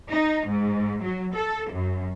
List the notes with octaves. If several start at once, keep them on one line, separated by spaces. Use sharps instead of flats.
D#4
G#2
F#3
A4
F#2